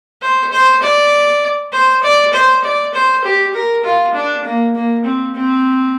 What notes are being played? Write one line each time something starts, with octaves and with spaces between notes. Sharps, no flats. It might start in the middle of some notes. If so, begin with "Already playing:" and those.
C5
C5
D5
C5
D5
C5
D5
C5
G4
A#4
F4
D4
A#3
A#3
C4
C4